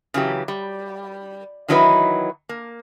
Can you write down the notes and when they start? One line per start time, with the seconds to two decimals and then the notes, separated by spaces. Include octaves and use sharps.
0.14 C#3 E3 F#3 G4
0.48 G3
1.68 D#3 E3 F#3 D#4 E4 B4
2.49 A#3